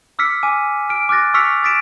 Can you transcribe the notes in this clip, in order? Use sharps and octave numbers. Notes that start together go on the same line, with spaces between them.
D6 E6 F6 B6 C#7
G#5 D6 F6 D#7
F6 D7
D6 F6 F#6 A6 A#6
C#6 E6 F6 B6 C#7 F7
D6 D#6 A6 B6 D7 E7